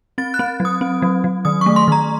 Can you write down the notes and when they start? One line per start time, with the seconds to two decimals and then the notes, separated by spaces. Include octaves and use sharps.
0.18 C4 A6
0.34 F#6
0.39 C4
0.60 F#3
0.65 D#6
0.81 C4
1.02 F#3
1.24 F#3
1.45 D#3 D#6
1.61 A3 C#6
1.76 C6
1.88 D#3 A#5